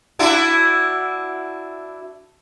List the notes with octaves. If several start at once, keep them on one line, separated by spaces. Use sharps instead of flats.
D4 E4 F#4